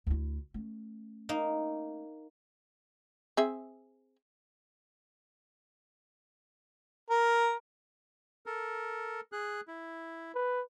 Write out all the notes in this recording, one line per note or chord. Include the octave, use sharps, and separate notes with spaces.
D2 E4
A3 C#4
A#3 D#4
C4 G#4 E5
A#4
A4 A#4
G#4 F#6
E4
B4